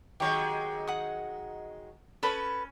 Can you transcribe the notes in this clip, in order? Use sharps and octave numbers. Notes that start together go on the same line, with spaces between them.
D#3 F#3 G#3 G4 C#5
F#5 D#6
C#4 A4 B4 B5